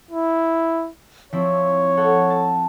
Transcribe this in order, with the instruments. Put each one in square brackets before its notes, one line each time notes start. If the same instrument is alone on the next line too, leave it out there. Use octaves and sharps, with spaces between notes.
[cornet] E4
[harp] F3 C4 E4 [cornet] C#5
[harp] A4 F#5 G#6
A5